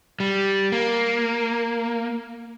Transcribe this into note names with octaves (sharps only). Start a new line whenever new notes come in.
G3
A#3